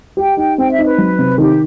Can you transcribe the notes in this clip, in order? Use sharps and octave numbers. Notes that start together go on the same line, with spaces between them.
G4 G5
D#4 G5
C4 G5
E5
D#4
B4
F#3
C3
D#3 G4